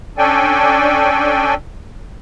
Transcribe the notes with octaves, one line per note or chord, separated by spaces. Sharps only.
C#4 D4 A4 D5 G5 G#5